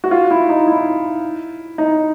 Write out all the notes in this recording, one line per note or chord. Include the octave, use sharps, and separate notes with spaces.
F#4
F4
E4
D#4
E4
D#4